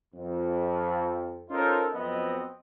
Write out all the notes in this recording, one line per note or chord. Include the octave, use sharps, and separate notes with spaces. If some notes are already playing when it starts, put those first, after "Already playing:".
F2
C#4 D#4 F4 A4 A#4 C5
F2 F#3 B3 C4 D#5